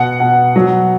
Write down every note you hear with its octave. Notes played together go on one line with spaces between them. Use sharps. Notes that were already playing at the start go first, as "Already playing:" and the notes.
Already playing: B2 F#5
B2
F#3